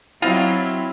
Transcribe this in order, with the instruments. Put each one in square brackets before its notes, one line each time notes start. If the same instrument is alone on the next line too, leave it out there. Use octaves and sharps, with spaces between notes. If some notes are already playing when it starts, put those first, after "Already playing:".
[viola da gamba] F#3 [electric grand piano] C4 E4 [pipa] F4 D#5 F5